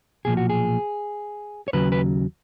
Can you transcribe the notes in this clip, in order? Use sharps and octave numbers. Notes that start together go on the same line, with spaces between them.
B1 A#2 F3 G#4
F#4
G#4
C#5
D#2 C#3 F#3 B4
B4